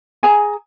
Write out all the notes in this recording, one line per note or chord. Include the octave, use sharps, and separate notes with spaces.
G#4 G#5 A#5